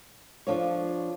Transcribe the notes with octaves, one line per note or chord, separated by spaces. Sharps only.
F3 D4 F4 A4 C#5